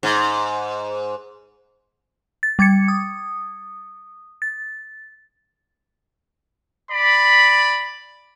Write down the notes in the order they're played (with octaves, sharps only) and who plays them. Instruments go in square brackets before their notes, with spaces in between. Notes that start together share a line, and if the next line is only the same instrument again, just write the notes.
[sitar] G#2
[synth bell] A6
G3 D6 G#6 A6 C#7
D#6
A6
[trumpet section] D5 B5